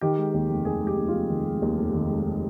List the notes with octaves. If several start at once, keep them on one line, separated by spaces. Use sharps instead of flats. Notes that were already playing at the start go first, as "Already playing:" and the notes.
D#3 G4
G#3
D#2
F1
D#3 G#4
G#3
G4
D#2
F4
F1
D#3
G#3
D#2
F1
D#3
G#3